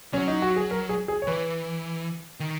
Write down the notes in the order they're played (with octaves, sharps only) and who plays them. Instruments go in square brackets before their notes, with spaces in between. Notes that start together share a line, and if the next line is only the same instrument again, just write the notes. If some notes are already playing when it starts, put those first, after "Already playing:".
[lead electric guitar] F#3 [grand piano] C#4
[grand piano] D#4
F#4
G#4
A#4
G#4
G#4
C#5
[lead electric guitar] E3 [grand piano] B4
[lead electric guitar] D#3